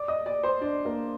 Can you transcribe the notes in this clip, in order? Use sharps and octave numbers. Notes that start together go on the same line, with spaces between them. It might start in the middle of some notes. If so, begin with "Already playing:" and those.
Already playing: D5 D6
D#5 D#6
D5 D6
C5 C6
D4 D5
A#3 A#4